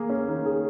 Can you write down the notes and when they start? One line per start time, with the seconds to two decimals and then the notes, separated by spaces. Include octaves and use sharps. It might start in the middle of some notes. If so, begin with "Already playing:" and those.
Already playing: A#3 G#4
0.10 C#4
0.29 D#3
0.46 G#4